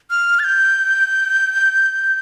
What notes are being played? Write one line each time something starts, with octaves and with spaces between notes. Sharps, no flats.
F6
A6
G6